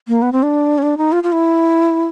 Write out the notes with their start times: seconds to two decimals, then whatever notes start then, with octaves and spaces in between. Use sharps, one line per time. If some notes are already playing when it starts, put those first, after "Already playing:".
0.08 A#3
0.22 B3
0.32 C4
0.43 D4
0.78 C#4
0.83 D4
0.98 D#4
1.12 F4
1.23 F4
1.32 E4